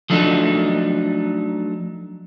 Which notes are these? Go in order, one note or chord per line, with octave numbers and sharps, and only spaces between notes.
F3 F#3 A3 D4 D#4